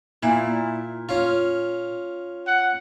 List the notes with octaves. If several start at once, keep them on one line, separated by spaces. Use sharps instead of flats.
A#2 E4
C#4 F4
F#5